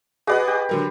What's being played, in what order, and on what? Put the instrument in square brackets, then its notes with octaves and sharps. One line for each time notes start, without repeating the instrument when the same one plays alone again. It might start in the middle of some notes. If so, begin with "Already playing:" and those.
[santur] F#4 B4 F#5 [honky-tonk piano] G#4 D5 D#5
[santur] G4
[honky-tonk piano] D3 F#3 A#4